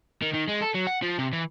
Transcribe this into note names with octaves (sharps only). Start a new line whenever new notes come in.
D#3
D#3
G#3
A4
F#3
F#5
F3
C3
E3